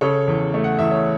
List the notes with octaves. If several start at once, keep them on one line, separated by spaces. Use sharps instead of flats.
C#3 A4 C#5
E2
A3
F#5
E2 E5
C#5